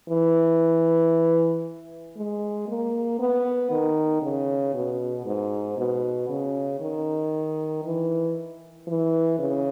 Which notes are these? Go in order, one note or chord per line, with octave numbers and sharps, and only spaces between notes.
E3
G#3
A#3
B3
D#3
C#3
B2
G#2
B2
C#3
D#3
E3
E3
C#3